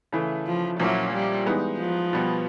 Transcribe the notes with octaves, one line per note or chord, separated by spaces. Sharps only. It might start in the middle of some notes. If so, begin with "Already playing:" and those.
C#3 E3 A3
F3
A#2 F3 F#3 A#3 C#4 E4
G3
E3 G#3 B3 D#4
F3
B2 G3 B3